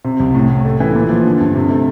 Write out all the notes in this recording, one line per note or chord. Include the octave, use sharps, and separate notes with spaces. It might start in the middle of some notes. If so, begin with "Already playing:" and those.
C3
C2
A2
A2
A3
E3
A#2
F3
D3
G2
C3
A3